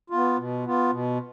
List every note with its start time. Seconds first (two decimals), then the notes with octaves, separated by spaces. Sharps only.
0.10 B3 F4
0.37 B2
0.64 B3 F4
0.91 B2